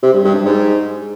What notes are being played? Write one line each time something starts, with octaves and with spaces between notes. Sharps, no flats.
C3
G2
G2
G2
G#2